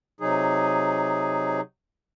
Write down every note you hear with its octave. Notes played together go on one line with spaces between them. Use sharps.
C3 F#3 D#4 G#4